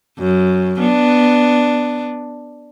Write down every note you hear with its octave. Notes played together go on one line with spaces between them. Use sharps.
F#2
B3 D4